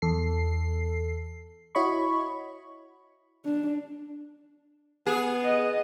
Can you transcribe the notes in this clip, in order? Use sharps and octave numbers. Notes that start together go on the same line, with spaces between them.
E2 A4 C7
E4 F#4 C#5 D#5 B5 C#6
D4
B3 G#4
D#5